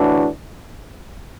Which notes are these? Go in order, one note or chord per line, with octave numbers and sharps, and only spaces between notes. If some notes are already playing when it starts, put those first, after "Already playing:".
Already playing: A2 E3 A3 D4 F#4